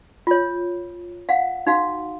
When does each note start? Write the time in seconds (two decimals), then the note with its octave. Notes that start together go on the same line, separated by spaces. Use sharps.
0.27 F4 C#5
1.29 F5 F#5
1.67 D#4 F#4 F5